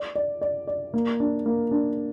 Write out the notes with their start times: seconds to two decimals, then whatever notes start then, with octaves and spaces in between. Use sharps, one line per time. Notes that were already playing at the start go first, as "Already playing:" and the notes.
Already playing: D5
0.15 D5
0.41 D5
0.67 D5
0.94 A#3
1.20 D4
1.46 A#3
1.71 D4